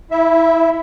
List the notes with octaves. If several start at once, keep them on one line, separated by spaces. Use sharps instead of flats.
E4 E5